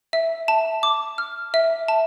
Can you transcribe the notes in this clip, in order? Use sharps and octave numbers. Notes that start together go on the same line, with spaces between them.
E5
A5
D6
F6
E5
A5